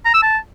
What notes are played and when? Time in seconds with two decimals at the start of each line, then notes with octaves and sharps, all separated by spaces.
0.05 A#5
0.14 E6
0.23 A5